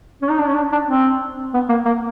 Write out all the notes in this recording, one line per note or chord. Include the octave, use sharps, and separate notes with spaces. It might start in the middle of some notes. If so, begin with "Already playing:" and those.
C#4
D#4
D4
C#4
D4
D4
C4
B3
A#3
A#3